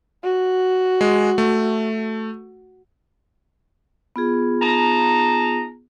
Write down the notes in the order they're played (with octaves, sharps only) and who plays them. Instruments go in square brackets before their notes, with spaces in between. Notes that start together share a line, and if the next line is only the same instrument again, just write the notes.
[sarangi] F#4
[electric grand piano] G#3
A3
[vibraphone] B3 F4 G#4
[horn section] D#4 A5 A#5